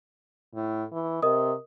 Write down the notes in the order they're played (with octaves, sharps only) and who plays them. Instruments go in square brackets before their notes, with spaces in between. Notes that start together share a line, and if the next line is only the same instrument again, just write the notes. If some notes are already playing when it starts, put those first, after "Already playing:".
[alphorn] A2
E3
[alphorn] C3 [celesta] A#4 D#5 D#6